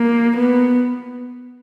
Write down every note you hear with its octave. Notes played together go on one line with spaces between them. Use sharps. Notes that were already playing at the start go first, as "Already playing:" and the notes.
Already playing: A#3
B3